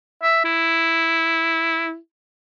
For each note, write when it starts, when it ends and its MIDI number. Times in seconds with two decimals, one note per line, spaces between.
0.23 0.40 76
0.45 1.97 64